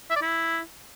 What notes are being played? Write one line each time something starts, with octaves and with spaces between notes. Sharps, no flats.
E5
D5
E4